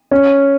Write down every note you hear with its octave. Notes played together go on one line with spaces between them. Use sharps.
C#4